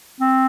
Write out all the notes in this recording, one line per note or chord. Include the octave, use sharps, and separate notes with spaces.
C4